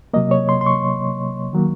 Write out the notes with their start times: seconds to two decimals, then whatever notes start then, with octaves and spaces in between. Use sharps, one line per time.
0.14 C3 F#3 A#3 D#5
0.31 C#5
0.49 C6
0.61 C6
0.66 C#6
1.53 D#3 F#3 A#3